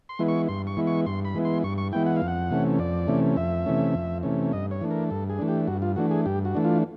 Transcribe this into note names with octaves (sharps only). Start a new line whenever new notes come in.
C6
E3 G#3 B3 E4
C#6
G2 C6
C#6
E3 G#3 B3 E4
C#6
G2 C6
B5
E3 G#3 B3 E4
C6
G2 C#6
C#6
E3 G#3 B3 E4 G5
F#5
F5
F2
F#5
C3 E3 A3 C#4
F2 D5
C3 E3 A3 C#4
F2 E5
C3 E3 A3 C#4
F2
C3 E3 A3 C#4
G2 D#5
C#5
E3 A3 D4
A#4
G2 A4
G#4
E3 A3 D4
G4
G2 F#4
F4
E3 A3 D4 F#4
G#4
G2 G4
F#4
E3 A3 D4
F4